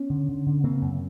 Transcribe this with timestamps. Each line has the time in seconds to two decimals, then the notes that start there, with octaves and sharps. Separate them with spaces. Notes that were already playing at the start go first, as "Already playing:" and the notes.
Already playing: B3 C#4
0.10 D3
0.28 D3
0.46 D3
0.64 C#3 A#3 C4
0.82 F#2